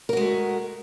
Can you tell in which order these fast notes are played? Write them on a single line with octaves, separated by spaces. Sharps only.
A#4 F#4 G#3 A3